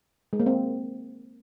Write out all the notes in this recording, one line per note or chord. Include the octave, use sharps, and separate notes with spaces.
G#3
A#3
C4